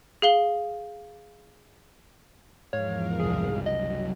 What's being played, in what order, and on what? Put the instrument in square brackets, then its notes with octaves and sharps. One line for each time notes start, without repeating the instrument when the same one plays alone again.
[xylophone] G#4 F5 G7
[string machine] E2 F3 A#4 [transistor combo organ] G#2 F5 [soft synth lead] C#5
[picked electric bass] F#1 C2 [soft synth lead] G#4
[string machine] F#3 [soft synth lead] D#5